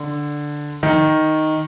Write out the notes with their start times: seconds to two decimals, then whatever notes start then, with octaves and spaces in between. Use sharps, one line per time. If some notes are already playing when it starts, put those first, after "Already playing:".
Already playing: D3
0.83 D#3